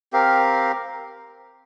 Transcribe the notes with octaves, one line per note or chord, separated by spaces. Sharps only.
C4 G4 A#4 F5